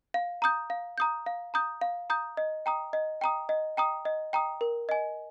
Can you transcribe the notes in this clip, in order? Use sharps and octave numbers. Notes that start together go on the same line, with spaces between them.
F5
A#5 D#6 G6
F5
A#5 D#6 G6
F5
A#5 D#6 G6
F5
A#5 D#6 G6
D#5
G5 A#5 D#6
D#5
G5 A#5 D#6
D#5
G5 A#5 D#6
D#5
G5 A#5 D#6
A#4
D#5 G#5